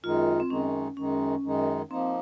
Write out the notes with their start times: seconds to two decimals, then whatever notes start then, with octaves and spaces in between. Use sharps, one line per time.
0.03 F#2 D#3 G#3 D#4 F4
0.40 C4
0.50 F#2 D#3 G#3 C#4 D#4
0.97 F#2 D#3 G#3 C#4 D#4
1.44 F#2 D#3 G#3 D#4
1.91 F3 A#3 C4 D#4